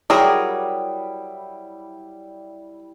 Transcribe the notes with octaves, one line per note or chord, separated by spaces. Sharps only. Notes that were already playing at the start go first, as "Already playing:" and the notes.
F#3 G3 E4 G#4 A#4